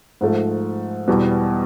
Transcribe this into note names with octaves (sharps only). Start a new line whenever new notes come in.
G#2 F3 A3
E2 B2 G3